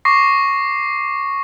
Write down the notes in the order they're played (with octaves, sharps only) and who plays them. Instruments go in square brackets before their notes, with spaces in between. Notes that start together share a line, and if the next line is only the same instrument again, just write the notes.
[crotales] C#6 D6 A#6 C7